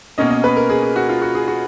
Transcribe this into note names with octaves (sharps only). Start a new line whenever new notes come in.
B2 A#3 C#4 D#5
D#5
B4
A#4
G#4
G#4
F#4
F4
F#4
G#4
F#4